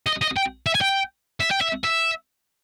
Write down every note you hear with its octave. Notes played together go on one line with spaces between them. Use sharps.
D#5
D#5
G5
E5
G#5
G5
E5
G5
E5
E5